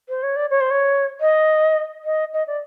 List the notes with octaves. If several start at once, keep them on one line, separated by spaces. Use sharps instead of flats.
C5
C#5
D5
C#5
C5
C#5
D#5
D#5
D#5
D5